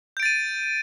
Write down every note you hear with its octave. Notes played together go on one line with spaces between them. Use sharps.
G6 A6 D7 D#7